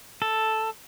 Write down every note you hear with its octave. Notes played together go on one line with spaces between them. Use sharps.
A4